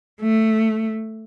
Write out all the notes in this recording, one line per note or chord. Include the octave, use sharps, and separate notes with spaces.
A3